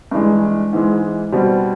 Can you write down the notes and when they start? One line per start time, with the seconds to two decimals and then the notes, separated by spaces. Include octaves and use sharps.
0.11 G2 E3 G#3
0.73 G#2 E3 G#3
1.32 B2 G3 C4